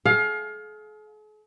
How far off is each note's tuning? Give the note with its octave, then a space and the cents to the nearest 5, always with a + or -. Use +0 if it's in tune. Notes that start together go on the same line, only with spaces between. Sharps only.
G#4 +45 F5 +25